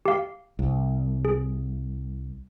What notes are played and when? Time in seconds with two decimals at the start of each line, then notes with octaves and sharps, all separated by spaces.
0.05 G4 F5
0.59 C2
1.25 G#4